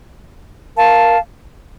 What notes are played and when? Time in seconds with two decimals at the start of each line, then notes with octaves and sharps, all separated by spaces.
0.76 A#4 F5 A5